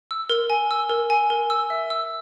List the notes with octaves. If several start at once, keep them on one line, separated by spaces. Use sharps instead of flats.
E6
A#4
G#5
E6
A#4
G#5
A#4
E6
E5
E6